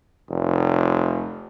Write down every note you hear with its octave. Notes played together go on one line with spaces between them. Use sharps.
F1